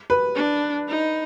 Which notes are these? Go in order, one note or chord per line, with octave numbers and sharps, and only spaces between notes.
B4
D4
D#4